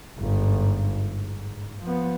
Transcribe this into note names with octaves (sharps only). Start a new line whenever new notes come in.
G1 G#2
G#2
F3 B3